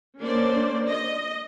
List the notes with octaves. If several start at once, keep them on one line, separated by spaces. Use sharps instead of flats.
A#3 C#4 D4 C5 D5
D#5